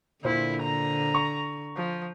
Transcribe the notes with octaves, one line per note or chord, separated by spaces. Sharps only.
A#2 D3 E4 C5
A#5
C#6
F3